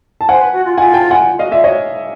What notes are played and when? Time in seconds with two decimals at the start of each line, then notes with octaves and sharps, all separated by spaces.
0.21 A5
0.29 C5 F#5 G#5
0.41 B4
0.53 F#4
0.65 F4
0.78 F4 F#5 G#5
0.94 G5 A5
1.10 F#5 G#5
1.27 F4
1.39 F#4 D#5 F5
1.51 F4 D5 E5
1.64 F#4 C#5 D#5